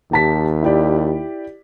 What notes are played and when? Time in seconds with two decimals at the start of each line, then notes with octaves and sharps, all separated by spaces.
0.12 D#2 G4 A5 B6
0.63 E4 G4 D5